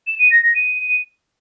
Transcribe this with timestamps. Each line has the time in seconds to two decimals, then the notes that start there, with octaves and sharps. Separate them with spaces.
0.07 E7
0.19 D#7
0.31 A#6
0.43 A#6
0.55 D#7